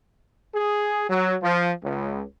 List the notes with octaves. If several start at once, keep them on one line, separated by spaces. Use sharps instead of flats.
G#4
F#3
F3
C#2